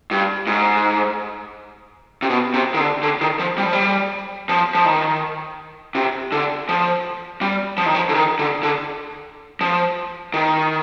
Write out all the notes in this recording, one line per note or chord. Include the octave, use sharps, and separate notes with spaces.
G2
G#2
C3
B2
C3
D#3
D3
D3
D#3
F3
G3
F3
G3
F3
F3
D#3
C3
D3
F3
G3
F3
D#3
F3
D3
D#3
D3
D3
F3
D#3